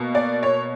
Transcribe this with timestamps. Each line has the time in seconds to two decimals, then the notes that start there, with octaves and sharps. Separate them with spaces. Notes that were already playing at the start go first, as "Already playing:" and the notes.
Already playing: B2 A#3
0.15 D5
0.43 C#5